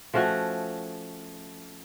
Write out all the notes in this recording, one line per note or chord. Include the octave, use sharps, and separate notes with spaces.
F3 A3 C#4 F#4